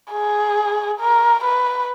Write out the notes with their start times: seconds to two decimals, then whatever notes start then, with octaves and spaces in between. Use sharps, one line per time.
0.12 G#4
1.00 A#4
1.44 B4